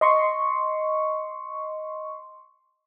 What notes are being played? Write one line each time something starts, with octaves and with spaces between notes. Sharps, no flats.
D#5 C6 C#6